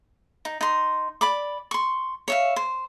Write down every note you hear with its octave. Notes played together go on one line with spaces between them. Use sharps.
D#4
D#4 C6
D5 B5 D6
C6 C#6
C#5 E5 F5
C5